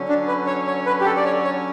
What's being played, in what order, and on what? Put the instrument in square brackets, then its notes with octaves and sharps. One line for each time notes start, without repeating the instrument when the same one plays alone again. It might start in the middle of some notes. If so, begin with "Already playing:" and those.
Already playing: [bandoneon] D3 F#3 C#4
[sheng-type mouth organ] D4
B4
C#5
C#5
B4
G4
A4
D5
C#5
C#5